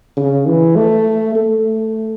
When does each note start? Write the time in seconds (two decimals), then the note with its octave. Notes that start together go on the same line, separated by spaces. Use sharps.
0.17 C#3
0.47 E3
0.77 A3
1.35 A3